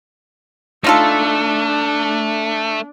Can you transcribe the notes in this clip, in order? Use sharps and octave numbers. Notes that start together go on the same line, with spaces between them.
A3 D4 D#4 F4 A4